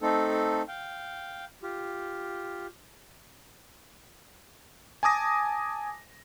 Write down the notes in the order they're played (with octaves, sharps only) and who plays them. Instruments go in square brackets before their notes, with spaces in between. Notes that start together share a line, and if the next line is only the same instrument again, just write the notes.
[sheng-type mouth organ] A3 C4 D#4 A4
F5 G5
F4 G4
[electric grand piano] G#5 A5 D6 D#6 A#6